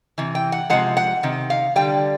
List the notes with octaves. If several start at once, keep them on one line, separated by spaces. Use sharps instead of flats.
C3 E3
G5
F#5
C3 F3 G#3 F#5
F#5
C3 D#3
F5
D3 G3 G5